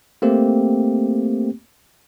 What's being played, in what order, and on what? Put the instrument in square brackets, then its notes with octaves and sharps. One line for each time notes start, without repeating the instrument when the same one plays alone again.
[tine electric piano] A3 A#3 C4 G4